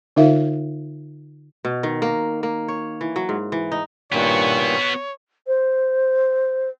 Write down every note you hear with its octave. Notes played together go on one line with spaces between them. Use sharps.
D3 D#4 F4 A#4 E5 F5
B2
D#3
A#3
A#3
C#5
E3
F#3
G#2
E3
D#4
G2 A#2 D#3 B3 F#4 C#5
C5